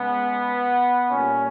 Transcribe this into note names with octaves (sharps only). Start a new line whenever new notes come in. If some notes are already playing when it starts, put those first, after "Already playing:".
Already playing: C#3 G#3 B3
A#2 G3 C#4